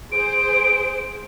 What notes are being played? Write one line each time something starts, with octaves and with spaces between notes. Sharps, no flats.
G#4 C5 D7